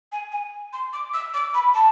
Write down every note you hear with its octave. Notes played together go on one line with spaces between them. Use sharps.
G#5
G#5
C6
D6
E6
D6
B5
A5